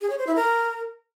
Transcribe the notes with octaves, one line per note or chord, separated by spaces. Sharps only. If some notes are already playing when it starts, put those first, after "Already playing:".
G#4
C#5
C5
E4
A#4